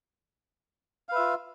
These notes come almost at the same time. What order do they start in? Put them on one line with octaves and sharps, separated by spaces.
F5 B4 E5 F4